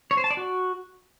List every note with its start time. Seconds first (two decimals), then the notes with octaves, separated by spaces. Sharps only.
0.11 C#5
0.17 C5
0.24 A5
0.31 D5
0.37 F#4